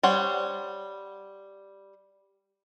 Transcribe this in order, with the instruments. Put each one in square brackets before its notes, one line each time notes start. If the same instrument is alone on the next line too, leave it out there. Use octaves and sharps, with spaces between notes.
[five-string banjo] G3 C5 C#5 F#5